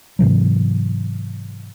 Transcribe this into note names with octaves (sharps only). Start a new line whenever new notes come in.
G#2 C3 E3 F#3